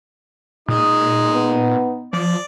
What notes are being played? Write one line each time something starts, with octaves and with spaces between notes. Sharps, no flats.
A#2 G#3 D#4 D#6
B3
F3 D5